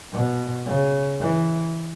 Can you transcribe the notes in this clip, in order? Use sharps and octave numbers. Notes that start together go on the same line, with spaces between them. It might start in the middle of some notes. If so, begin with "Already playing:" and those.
B2
C#3
E3